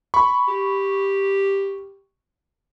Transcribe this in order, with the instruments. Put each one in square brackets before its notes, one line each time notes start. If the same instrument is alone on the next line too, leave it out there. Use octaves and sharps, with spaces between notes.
[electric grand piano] B5 C#6
[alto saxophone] G4